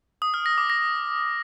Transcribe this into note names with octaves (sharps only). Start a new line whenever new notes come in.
D#6
F6
A#6
D6
A#6